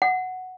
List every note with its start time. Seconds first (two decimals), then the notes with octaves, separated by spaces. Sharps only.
0.02 F#5